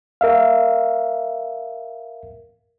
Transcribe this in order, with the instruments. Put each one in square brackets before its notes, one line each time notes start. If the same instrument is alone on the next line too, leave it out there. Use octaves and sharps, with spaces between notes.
[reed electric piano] A#4 E5 F5